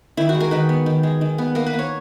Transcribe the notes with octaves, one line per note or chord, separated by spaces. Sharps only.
D#3 E4
F#4
G#3
A#4
D#3 B4
B3
D#3
G#3
D#3
B3
A#3 A#4
B4
A#3
C#5